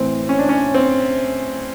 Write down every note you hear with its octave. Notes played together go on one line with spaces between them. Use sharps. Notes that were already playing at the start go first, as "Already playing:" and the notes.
Already playing: A2 E3 C4
C#4
D4
C#4
C4